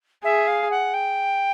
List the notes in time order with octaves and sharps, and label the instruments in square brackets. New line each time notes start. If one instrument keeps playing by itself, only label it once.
[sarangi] G#4 [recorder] E5
[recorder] F5
F#5
G5